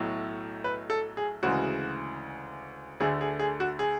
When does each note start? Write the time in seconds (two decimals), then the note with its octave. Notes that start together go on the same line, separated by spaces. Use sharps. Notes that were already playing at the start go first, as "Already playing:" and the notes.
Already playing: B1 A2 F#3 A3
0.64 B4
0.90 A4
1.17 G#4
1.43 D2 C#3 E3 G#3 F#4
3.00 D2 D3 A3 G#4
3.21 G#4
3.39 G#4
3.60 F#4
3.79 G#4